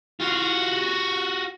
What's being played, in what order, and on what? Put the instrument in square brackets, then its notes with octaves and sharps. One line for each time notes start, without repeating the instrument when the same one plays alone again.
[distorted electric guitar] F4 F#4